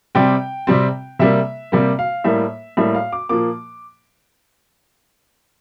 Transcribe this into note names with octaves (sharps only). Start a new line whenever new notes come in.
C3 G3 C4 G5
C3 G3 C4
C3 G3 A#3 E5
C3 G3 A#3
F5
A2 G3 A#3 E5
A2 G3 A#3 E5
F5
D6
A#2 F3 A#3 D6